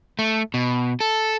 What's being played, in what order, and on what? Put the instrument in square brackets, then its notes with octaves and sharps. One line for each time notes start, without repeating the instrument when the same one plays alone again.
[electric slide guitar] A3
B2
A4